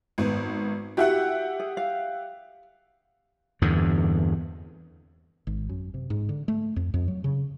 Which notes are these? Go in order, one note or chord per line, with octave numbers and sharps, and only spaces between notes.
G#1 B3
E4 F#4 G4 E5 F#5
G#4
F5
E2 G2 D3
G#1
F#2
C3
G#2
D3
A3
F2
F2
F#3
C#3